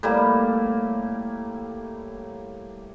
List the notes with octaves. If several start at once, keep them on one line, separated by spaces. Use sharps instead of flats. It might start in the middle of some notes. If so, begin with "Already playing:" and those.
A2 G3 A#3